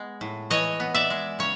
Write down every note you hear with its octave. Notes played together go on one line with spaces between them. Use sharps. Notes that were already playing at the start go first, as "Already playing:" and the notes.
Already playing: G#3 B3
A2
E3 C#5 D#5
B3
D5 E5
G#3
C#3 C#5